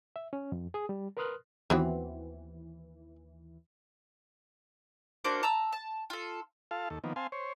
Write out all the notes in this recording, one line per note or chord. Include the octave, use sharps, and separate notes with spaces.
E5
C#4
F2
G#4 D#6
G3
A#4 B4 C6 D#6 F6 F#6
D#2 E3 B3 C4 F#4
A#3 D4 F#4 C5
A5 A#5 E6
A5
F4 A4
F4 A4 F5 A5
D#2 A4
D#3 F3 A#3 B3
C4 F5 G#5 A5 C6
C5 C#5